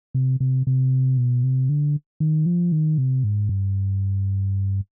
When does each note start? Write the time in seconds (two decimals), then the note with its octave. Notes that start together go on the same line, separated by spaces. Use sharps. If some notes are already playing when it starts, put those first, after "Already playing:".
0.14 C3
0.40 C3
0.67 C3
1.18 B2
1.43 C3
1.69 D3
2.20 D#3
2.46 F3
2.72 D#3
2.98 C3
3.24 G#2
3.49 G2